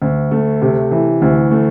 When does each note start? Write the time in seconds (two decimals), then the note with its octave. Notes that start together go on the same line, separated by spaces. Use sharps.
0.02 D2
0.31 A3
0.62 C3
0.91 E3
1.22 D2
1.51 A3